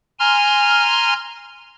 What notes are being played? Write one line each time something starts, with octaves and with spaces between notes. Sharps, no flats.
G#5 A#5 C6 F6